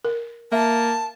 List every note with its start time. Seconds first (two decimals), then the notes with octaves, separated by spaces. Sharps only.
0.05 A#4
0.52 A#3 E5 A5